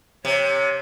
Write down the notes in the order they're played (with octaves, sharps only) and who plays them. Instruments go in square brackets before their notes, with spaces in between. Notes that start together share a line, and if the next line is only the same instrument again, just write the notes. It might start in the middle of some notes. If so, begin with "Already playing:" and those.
[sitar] C3 [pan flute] C#5